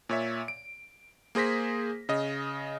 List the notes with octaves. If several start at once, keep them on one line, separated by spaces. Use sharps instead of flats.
A#2 C#5 E5
D7
A#3 G#4 C5 A#6 B6
C#3 D#5